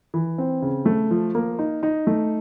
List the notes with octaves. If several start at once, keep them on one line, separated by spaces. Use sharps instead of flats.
E3
C4
C#3
A3
F3
A#3
D#4
D#4
A3